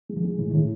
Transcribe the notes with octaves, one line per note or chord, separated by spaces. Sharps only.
G#3
F3
G#3
A2 E3
D#3
A2